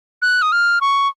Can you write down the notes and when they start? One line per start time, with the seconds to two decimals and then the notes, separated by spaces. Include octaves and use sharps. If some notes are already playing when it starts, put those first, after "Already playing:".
0.22 F#6
0.42 D#6
0.52 F6
0.81 C#6